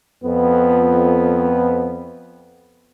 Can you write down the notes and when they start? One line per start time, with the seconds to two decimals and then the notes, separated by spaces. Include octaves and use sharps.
0.24 F2 B3